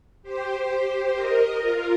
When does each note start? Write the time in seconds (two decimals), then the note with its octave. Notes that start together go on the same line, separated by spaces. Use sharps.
0.22 G4 C5
1.14 A#4 D#5
1.60 F4 A#4